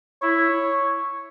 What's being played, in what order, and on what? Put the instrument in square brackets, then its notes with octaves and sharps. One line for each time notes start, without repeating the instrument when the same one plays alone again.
[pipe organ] E4 [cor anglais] C#5